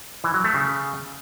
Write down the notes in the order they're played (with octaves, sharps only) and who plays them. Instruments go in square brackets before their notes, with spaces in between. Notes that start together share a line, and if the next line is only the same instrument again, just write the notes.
[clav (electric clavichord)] E3
F#3
A3
C#3